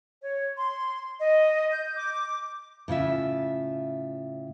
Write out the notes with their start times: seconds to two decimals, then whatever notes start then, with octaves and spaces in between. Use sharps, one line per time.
0.23 C#5
0.57 C6
1.19 D#5
1.72 G6
1.96 D6
2.88 A2 C#3 F4 E5